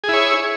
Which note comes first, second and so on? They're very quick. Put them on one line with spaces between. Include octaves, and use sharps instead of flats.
G#4 E4 C#5